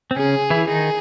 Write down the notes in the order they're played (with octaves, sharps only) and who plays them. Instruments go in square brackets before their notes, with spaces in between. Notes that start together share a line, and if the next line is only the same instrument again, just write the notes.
[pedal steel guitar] C4
[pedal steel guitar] C#3 C#4 [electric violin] G#4
[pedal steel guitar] E3 E4
[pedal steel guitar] D#3 D#4 [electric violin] G#4